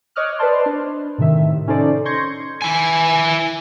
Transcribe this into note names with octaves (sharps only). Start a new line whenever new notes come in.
C#5 D#5 D6 D#6 F6 F#6
B4 C5 D5 A5 C6
D4
A2 C3 D#3 E5
C#4 D#4 A4 C5 D5
C6 C#6 G6 G#6 A#6 C#7
E4 G#5